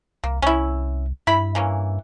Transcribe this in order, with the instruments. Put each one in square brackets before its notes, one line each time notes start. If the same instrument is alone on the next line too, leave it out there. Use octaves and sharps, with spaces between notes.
[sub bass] C2 [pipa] A#3
[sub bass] C2 [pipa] C#4 E4
[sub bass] G2 [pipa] E4 B5
[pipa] E3 A#3 C#4